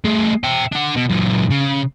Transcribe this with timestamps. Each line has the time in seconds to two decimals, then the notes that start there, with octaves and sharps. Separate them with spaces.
0.04 A3 G#4
0.44 E5 G5
0.72 D4 F#5
0.96 B2
1.10 F#2 A#2
1.51 C#3